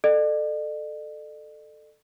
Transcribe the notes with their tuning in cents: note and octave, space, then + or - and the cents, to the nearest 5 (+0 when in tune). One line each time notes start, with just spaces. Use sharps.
A4 +0 D5 +45